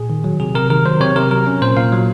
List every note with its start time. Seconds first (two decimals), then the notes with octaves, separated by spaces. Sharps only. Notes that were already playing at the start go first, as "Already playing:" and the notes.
Already playing: A#2 G#4
0.10 D#3
0.24 F#3
0.40 C3 G#4
0.55 C3 A#4
0.70 D#3 A#4
0.86 F#3 C5
1.00 C3 C#5
1.16 C3 A#4
1.31 F#3 A#4
1.47 C#4
1.61 A#2 C5
1.77 A#2 F5
1.92 F#3